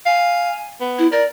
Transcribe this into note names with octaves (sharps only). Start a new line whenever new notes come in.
F5 G#5
B3
E4
A#4 D5